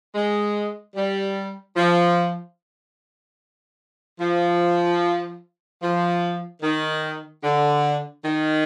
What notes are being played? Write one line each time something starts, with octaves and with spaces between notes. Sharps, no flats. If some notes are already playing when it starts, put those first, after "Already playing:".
G#3
G3
F3
F3
F3
D#3
D3
D#3